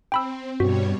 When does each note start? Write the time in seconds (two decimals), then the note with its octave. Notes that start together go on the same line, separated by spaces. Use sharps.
0.12 C4 G5 B5 E6
0.60 G2 B2 G3 F#4 C#5